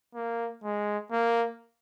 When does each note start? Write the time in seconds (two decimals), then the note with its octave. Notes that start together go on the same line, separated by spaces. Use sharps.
0.15 A#3
0.64 G#3
1.12 A#3